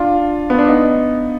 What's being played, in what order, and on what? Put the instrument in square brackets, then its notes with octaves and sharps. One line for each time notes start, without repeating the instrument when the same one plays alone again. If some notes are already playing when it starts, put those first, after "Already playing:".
Already playing: [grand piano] D4 F4
B3
D4
B3 D#4